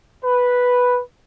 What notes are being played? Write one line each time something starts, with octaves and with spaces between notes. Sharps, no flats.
B4